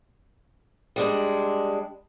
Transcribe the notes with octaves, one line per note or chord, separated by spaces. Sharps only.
G3 G#3 D4